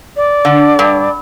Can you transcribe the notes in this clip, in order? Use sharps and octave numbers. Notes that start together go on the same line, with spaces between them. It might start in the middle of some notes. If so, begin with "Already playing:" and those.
D5
D3
G2